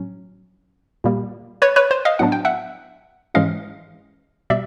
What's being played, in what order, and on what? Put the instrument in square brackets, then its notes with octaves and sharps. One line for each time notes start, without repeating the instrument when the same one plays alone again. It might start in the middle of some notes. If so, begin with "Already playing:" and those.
Already playing: [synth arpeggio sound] A2 F#3 C#4
A#2 G3 A#3
B4 C#5
B4 C#5
C5
D#5 F5
A2 F#3 B3 D4 F#5
G5
E5 F#5
G#2 E3 G#3 C#4 E4 D#5 F5
B2 G3 D5 E5